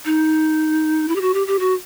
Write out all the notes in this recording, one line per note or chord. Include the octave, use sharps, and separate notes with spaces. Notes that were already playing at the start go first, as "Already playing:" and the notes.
D#4
E4
G4
F#4
G4
G4
F#4